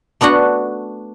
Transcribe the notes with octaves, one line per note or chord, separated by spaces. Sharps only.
A3 B3 D4 F#4 F#5